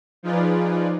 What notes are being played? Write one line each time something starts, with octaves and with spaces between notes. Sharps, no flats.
F3 D#4 F4 G#4 B4 D5